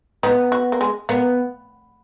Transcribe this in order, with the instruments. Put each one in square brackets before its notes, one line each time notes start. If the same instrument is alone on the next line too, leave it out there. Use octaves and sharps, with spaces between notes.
[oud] B3 [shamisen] D#4
[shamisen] F#4
A#3
G#3
[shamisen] A#3 [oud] B3